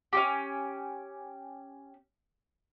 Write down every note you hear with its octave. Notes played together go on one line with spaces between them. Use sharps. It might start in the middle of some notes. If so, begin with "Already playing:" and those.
C#4 F#4 G4